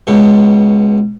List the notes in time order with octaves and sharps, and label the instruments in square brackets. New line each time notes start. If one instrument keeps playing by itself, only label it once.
[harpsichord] C#2 B2